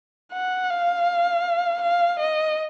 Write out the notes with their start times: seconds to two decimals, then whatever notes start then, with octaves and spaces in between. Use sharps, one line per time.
0.33 F#5
0.70 F5
1.81 F5
2.19 D#5